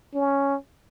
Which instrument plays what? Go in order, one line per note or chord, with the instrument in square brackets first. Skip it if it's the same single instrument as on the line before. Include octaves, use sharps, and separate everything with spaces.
[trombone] C#4